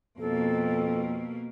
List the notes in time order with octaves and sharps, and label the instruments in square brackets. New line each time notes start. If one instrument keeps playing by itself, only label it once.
[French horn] F2 [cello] B2 A#3 [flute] A4